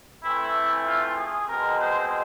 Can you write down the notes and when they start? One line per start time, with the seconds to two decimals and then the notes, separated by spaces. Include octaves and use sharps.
0.24 E3 A3 C4 E4
0.86 F4
1.17 G#4
1.49 B2 G#3 C4 A#4
1.80 C5